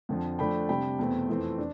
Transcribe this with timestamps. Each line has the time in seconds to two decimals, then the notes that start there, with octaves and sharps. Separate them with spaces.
0.09 F2 D3 F3
0.39 D3 F3 A3 D4 G5 B5
0.69 C3 G3 D4 G5 B5
0.99 E2 B2 A3 C4
1.29 F2 E3 A3 C4
1.58 D4